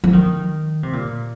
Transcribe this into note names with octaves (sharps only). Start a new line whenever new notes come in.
F3
D#3
C3
A#2